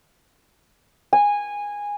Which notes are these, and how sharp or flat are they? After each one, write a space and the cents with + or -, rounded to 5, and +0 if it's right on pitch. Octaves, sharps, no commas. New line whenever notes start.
G#5 -15